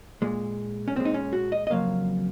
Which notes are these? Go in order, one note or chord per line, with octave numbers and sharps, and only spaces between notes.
A#2 G#3
C#4
A#2 G#3 C4
D#4
C#4
F#4
D#5
D#5
F2 C#3 F#3 A#3 F5